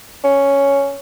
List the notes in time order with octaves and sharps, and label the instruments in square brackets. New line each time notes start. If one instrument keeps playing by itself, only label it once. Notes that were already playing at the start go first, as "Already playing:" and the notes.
[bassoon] C#4